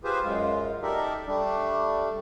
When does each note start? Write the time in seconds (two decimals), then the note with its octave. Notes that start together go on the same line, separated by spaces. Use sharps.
0.04 F4 G4 G#4 B4 C5
0.24 F#2 G#3 F4
0.83 D#4 G4 A4 A#4 D5 E5
1.27 G3 A3 D4